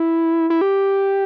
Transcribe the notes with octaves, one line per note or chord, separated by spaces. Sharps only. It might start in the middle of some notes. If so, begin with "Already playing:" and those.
Already playing: E4
E4
G4